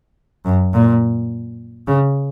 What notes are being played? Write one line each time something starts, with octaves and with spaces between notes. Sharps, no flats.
F#2
A#2
C#3